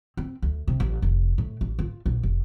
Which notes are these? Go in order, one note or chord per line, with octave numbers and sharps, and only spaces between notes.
C4
D2
C3
A1
F1
A2
A1
F4
A#1
F1